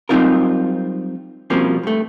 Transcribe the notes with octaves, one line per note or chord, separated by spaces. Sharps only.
F#3 G3 C4 D#4 F4 A#4
B2 F3 G3 A#3 C4 C#4
G2 A3